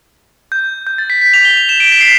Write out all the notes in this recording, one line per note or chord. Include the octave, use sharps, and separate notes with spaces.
G6
G6
A6
B6
B6
F7
G7
F7
E7
D7
B6
C7